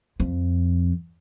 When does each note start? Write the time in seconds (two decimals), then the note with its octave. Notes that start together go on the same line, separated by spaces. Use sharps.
0.20 F2